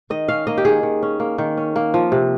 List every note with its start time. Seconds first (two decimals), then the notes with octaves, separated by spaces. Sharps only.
0.10 D#3 D#5
0.28 C#4 F5
0.47 A#3 D#5
0.58 G4
0.65 D#3 G#4
0.83 D#3
1.03 C#4
1.20 A#3
1.38 D#3
1.57 C#4
1.76 A#3
1.94 F3
2.12 C3